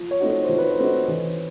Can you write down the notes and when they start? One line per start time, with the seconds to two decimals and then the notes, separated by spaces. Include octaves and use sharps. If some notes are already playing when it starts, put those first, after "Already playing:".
Already playing: F3
0.11 C#5
0.20 A3 C4 D#4 F#4
0.30 C#5
0.44 C5
0.49 F3
0.58 B4
0.72 C5
0.79 A3 C4 D#4 F#4
1.08 E3